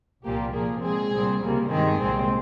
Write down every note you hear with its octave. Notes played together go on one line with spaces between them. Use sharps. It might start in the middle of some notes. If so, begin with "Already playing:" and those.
C2 A#2 F3 A#3 G4
A#2 F3 A#3 G#4
A#2 G#3 C4 G#4
C2 A#2 G3 C4
C#2 C3 G3 A#3
G2 D#3 G#3 C4 G#4
C2 A#2 G#3 C4